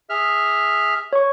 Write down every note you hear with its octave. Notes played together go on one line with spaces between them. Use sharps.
G#4 E5 F6
C#5 C#6